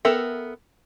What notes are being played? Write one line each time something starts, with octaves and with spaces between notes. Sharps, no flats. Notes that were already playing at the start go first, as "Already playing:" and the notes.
B3 A4 A#4 E5 G5